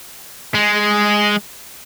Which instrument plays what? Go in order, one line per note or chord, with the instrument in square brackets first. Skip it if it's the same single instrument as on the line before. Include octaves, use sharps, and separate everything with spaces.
[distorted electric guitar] G#3